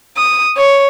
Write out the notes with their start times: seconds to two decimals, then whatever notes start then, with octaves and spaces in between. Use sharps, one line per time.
0.17 D#6
0.57 C#5